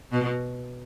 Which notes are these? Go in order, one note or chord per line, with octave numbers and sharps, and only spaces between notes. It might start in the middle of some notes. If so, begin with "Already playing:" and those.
B2